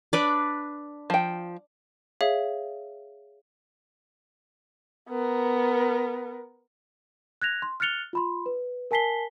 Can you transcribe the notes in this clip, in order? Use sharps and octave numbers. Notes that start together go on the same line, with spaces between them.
D4 B4 D5
F3 G5
G#4 C#5 E5 F5
B3 A#4
F#6 G#6 A#6 F7
C6
F6 F#6 A6 C#7 F7 G7
F4 B5 C6
B4
A#4 G#5 A5 B6 C7 G7